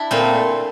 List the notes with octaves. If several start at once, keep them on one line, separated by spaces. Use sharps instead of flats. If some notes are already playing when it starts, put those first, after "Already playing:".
Already playing: D4 E4
A#2 A3 C4